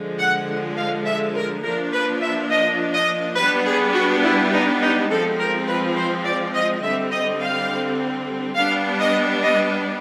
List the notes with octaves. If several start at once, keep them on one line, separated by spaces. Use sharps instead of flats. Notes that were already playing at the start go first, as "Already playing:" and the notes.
Already playing: D3 F3 G#3
F#5
F5
E5
A#4
F3 A#3 D4 A#4
B4
E5
D#5
D#5
G3 B3 D4 B4
G#4
F#4
E4
D#4
D#4
F3 G#3 C4 A4
A#4
B4
C5
D5
D#5
D3 G3 C4 E5
D#5
F5
G3 B3 D4 F5
D#5
D#5